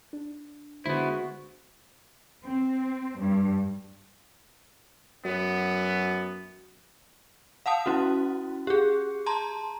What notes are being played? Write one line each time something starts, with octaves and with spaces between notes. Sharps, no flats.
D4
D3 G#3 B3 D4 E4 F#4 C5
C4
G2
F#2 B3
F5 F#5 A5 D#6
C#4 E4 F#4
G4 G#4
A5 A#5 C6